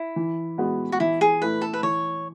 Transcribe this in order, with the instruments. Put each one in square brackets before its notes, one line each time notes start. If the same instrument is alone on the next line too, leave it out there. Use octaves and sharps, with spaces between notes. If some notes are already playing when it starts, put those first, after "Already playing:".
Already playing: [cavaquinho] E4
[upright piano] E3
G#3 B3 F#4
[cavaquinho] F#4
[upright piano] E3 [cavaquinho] E4
[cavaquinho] G#4
[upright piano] A3 E4 [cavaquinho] B4
[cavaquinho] A4
B4
[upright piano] E3 [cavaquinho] C#5